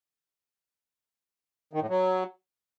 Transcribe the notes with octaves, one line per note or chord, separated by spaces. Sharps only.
D#3
A2
F#3